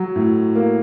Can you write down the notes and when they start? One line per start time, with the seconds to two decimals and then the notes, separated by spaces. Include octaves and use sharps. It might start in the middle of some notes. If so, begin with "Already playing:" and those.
Already playing: F#3
0.16 A2
0.55 A#3